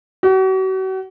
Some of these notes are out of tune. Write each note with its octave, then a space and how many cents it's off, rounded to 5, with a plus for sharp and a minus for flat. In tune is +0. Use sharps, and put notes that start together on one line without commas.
F#4 +40